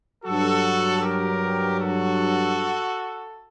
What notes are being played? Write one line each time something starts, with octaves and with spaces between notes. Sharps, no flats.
G2 F#3 F#4 A4
G4 A#4
F#4 A4